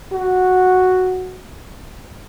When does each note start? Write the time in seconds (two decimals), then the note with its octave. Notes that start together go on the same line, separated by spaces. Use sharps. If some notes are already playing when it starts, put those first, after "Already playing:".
0.13 F#4